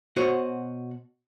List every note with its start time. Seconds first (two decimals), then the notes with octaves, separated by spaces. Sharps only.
0.16 B2 F#4 C5 C#5 D#5